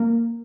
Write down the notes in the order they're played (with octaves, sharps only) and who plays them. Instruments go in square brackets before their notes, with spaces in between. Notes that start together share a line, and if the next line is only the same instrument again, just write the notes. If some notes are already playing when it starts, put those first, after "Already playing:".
Already playing: [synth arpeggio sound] A#3